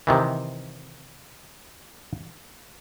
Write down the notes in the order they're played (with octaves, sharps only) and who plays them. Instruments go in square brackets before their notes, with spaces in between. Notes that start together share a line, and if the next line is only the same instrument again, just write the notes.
[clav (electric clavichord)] C3 D#3 E3